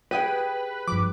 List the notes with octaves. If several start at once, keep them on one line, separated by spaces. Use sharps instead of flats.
G4 G#4 B4 G5 D#7
G2 F3 D6